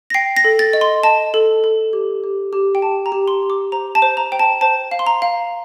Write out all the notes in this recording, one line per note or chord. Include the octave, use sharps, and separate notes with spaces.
A#6
G5 C7
A#6
A4
A6
D#5
C6
D#5 A5
A4
A4
G4
G4
G4
G5
G4 A5
A#5
G4
C6
G4
D6
C5 A#5
A5
C5
A#5
C5 G5
A5
C5 A5
F5
C6
A#5
F5